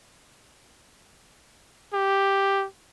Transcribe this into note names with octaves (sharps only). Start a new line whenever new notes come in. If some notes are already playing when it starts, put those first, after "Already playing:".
G4